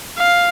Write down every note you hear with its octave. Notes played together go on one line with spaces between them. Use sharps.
F5